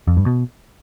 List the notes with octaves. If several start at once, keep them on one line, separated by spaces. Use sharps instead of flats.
F2
G2
B2